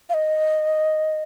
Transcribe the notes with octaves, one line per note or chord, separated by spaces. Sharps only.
F5
D#5